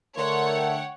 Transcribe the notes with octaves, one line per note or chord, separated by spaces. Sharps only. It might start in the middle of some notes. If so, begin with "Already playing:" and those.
D3 A3 A#4 C#5 F#5 C6
G5